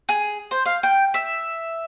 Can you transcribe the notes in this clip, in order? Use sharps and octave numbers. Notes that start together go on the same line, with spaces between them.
G#4
C5
F5
G5
E5